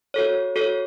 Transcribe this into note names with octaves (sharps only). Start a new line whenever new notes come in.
F#4 A4 C#5
F#4 A4 C#5